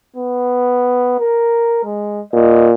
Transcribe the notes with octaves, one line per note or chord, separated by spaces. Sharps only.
B3
A#4
G#3
A#2 D#5